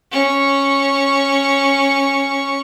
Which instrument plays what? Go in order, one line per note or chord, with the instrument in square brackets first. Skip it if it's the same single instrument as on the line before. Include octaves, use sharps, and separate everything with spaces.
[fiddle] C#4 C#6